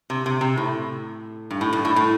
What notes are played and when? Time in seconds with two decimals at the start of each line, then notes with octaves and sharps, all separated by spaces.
0.10 C3
0.26 C3
0.41 C3
0.57 A2
1.51 G2
1.61 A2
1.73 G2
1.85 A2
1.96 A2